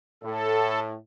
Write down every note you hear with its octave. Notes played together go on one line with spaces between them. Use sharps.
A2 A4